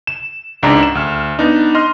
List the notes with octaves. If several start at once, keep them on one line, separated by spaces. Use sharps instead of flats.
E7
C#2 G#2 D4 A#5
E7
D2 F6
B3 D4 D#4
D#5 C6 F6